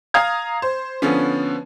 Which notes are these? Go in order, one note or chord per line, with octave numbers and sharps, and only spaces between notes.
F5 A#5 D#6 G#6
C5
D3 F3 B3 C#4